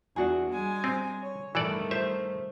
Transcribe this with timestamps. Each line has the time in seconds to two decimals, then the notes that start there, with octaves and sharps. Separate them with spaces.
0.16 E2 D4 F#4 G#4
0.51 G3 G#3 G#5
0.84 C4
1.21 C#5
1.55 G2 D#3 E3 A3 A4 D5 A5
1.91 C5 E5